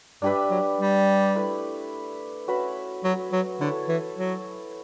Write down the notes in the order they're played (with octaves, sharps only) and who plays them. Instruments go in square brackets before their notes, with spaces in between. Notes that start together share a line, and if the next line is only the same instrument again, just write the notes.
[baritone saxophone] G2 [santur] D4 G4 B4 E5
[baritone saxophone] F#3
G3
[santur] A3 E4 B4
C#4 F#4 B4 E5
[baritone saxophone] F#3
F#3
[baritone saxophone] D3 [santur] E4 A4 C#5
[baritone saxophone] E3
F#3